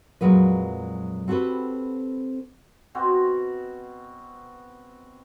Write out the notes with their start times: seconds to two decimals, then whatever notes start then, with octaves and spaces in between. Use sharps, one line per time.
0.21 F2 A#2 F#3 G#3 B4
1.28 C4 F#4 G4 A4 B4
2.95 B2 C4 F#4